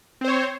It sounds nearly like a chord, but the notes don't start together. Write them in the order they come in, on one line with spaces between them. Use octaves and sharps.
C4 C5 C#5